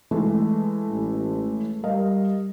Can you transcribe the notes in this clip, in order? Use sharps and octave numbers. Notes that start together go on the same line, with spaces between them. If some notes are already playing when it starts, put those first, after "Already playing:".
E3 G#3 A3
A1
G3 A#4 D#5 F5